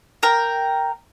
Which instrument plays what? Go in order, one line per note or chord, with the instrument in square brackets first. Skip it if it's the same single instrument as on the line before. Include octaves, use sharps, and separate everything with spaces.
[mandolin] A#4 G5